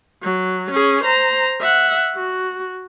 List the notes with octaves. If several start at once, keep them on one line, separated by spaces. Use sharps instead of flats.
F#3
C#4 G#4
C5 A#5
E5 F#5
F#4